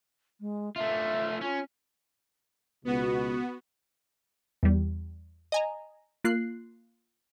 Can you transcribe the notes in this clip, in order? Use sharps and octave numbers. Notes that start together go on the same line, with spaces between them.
G#3
A3 F4 E5
C#4 F4
C#2 B2 B3 F#4
E2 G3
D#5 G#5 A#5
A#3 F4 F#6 C7